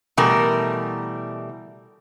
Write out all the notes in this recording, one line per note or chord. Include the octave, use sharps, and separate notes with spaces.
B2 E3 G3 A3 A#4